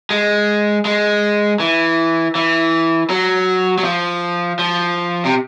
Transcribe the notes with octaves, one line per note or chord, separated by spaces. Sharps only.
G#3
G#3
E3
E3
F#3
F#3
F3
F3
C3